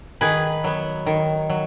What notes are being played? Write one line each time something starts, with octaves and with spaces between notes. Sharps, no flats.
D#3 G#4 B4
F#3 B3
D#3
F#3